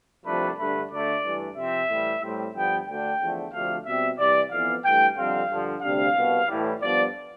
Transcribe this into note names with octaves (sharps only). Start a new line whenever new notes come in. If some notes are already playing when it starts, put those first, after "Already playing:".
C2 C3 F3 A3 D4 B4
G2 D3 A3 B4
D2 D3 A3 D5
G2 E3 A3 D4
C3 F3 C4 E5
A2 E3 G3
A2 G3 C4
G2 D3 F3 B3 G5
D2 D3 A3 D4 G5
E2 D3 F3 A3
D2 C3 F3 A3 D4 F5
B2 G3 C4 E5
C3 E3 G3 D5
F2 E3 B3 F5
G2 E3 A3 G5
F2 D3 G3 C4 F5
G2 D3 F3
D2 C3 G3 D4 F5
C2 B2 B3
A2 E3 G3
G2 F3 B3 D5